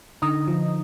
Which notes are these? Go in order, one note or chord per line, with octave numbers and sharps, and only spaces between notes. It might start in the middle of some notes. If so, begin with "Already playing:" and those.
D3 D#4 D#5
F3